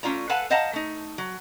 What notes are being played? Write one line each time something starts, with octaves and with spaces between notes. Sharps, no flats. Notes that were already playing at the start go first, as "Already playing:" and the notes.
A3 C#4 F4 D5 A#5
A4 B4 F5 F#5 G#5 A5
C5 D#5 F5 F#5 A5 A#5
A3 D#4
F#3